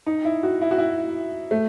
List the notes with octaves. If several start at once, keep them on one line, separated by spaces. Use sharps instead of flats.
D#4
E4
F#4
E4
F#4
E4
A3